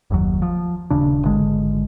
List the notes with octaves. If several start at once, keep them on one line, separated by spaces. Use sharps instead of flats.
F#1 D#2 F#3
F3
D#1 D#2 C#3 D4
G#1 D3 G#3